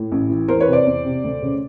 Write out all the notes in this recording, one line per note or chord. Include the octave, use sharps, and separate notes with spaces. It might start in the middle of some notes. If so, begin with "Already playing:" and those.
Already playing: A2
A1
E3
E2 A#4 C5
B4 C#5
C3
C5 D5
E2
C3
D2
C#3